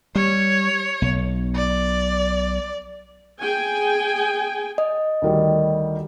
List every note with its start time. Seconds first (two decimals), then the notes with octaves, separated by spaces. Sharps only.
0.15 G3 C#5
1.02 B1
1.56 D5
3.40 G#4 G5 G#5
4.78 D#5
5.22 D2 D#3 G3